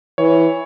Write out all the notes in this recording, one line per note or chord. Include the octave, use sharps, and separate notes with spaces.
E3 C#5